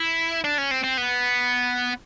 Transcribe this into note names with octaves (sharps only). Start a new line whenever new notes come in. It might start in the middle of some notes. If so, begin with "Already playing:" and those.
Already playing: E4
D4
C#4
C4
C4
B3